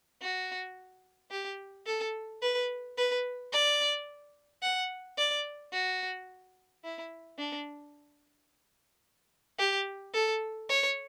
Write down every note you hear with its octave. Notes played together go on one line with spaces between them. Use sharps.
F#4
G4
A4
B4
B4
D5
F#5
D5
F#4
E4
D4
G4
A4
C#5